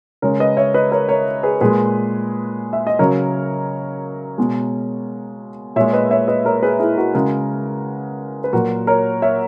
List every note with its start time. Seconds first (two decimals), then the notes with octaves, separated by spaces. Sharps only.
0.22 C#3 G#3 A#4 C#5
0.40 B4 D#5
0.57 C#5 E5
0.74 B4 D#5
0.92 A#4 C#5
1.09 A#4 C#5
1.43 G#4 B4
1.61 A#2 G#3 G#4 B4
2.73 E5
2.87 D#5
2.99 C#3 F#3 A#4 C#5
4.38 B2 G#3
5.76 A#2 G#3 C#5 E5
5.93 B4 D#5
6.11 C#5 E5
6.28 B4 D#5
6.45 A#4 C#5
6.63 G#4 B4
6.80 E4 G#4
6.98 F#4 A#4
7.15 C#3 G#3 F#4 A#4
8.44 B4
8.53 A#2 F#3 F#4 A#4
8.87 A#4 C#5
9.22 C#5 E5